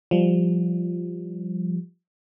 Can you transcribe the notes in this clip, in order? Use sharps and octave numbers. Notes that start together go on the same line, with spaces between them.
F3 G3